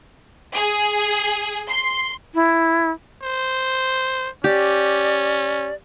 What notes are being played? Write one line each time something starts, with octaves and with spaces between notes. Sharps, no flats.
G#4
C6
E4
C5
C#4 G4 D5